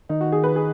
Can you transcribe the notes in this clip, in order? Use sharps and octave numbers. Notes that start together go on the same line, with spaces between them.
D#3 D#4
F#4
G#4
B4
G#4